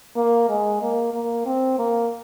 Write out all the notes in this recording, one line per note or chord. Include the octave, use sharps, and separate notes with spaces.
A#3
G#3
A#3
A#3
C4
A#3